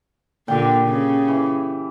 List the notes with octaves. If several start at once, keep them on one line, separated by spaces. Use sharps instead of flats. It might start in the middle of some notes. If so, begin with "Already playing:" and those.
A#2 D3 G4 G5
C#3
E3